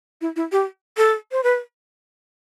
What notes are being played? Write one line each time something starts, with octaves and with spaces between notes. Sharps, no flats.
E4
E4
G4
A4
C5
B4